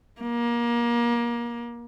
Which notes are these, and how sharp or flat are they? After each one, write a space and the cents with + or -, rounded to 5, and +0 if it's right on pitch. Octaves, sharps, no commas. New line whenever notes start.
A#3 +25